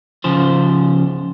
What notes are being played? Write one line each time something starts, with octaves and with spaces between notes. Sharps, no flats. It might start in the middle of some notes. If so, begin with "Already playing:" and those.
C#3 F3 C5